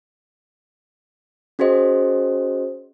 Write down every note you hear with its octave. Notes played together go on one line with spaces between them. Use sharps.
C#4 F#4 G#4 C5 D#5